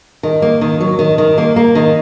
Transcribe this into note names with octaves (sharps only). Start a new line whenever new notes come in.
D#3
A#3
D#3
F#3
D#3
D#3
A#3
A#3
D#3